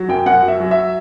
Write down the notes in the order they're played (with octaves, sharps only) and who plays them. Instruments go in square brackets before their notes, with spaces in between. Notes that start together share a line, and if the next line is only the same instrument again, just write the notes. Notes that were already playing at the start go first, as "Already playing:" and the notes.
Already playing: [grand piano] F#3
F#2 G5
F#2 F#5
F#3
E5
F#3
E5